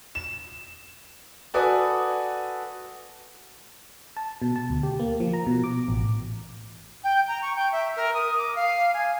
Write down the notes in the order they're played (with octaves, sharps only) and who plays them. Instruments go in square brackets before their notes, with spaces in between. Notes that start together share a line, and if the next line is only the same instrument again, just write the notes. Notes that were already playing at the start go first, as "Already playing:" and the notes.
[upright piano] E7
F#4 A4 B4 D5 G#5 D#6
[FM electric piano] A5
B2
A5
D2
G4
A#3
F3
A#5
B2
D6
A1
[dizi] G5
A#5
C#6
G5
E5
A#4
D#6
D6
F5
G#5